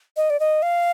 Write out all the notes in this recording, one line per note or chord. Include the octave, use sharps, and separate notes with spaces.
D#5
D5
D#5
F5